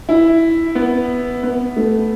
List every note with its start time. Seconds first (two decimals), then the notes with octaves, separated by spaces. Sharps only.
0.09 E4
0.75 B3
1.43 B3
1.77 A3